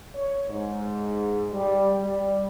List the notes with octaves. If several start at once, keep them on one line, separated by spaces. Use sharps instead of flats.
C#5
G#2
G3
G3